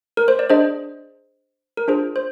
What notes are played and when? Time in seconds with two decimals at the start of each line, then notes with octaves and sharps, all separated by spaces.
0.17 A#4
0.28 C5
0.39 D5
0.49 D4 G#4 C5 D#5
1.77 A#4
1.88 D4 F4 G#4 C5
2.16 C5